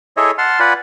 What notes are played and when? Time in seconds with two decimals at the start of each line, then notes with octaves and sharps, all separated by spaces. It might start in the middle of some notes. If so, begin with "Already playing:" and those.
0.17 E4 G#4 A4 C#5 D#5 E5
0.38 F#5 A5 C6 F6
0.60 F4 B4 D5 F#5 G#5 B5